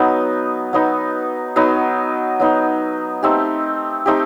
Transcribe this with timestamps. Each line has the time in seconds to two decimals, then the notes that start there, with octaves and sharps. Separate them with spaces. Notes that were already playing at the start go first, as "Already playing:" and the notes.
Already playing: F#3 B3 D#4
0.73 F#3 B3 D#4
1.56 F#3 B3 D#4
2.40 F#3 B3 D#4
3.23 A3 C4 D#4 G4
4.06 A3 C4 D#4 G4